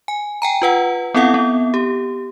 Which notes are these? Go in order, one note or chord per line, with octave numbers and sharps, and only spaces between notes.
G#5
G5 G#5 A#5
F4 B4 F#5
B3 C4 E4 A4 F5 F#5
B3
G4